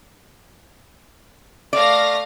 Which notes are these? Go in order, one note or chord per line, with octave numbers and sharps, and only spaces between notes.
A3 D5 F5 A#6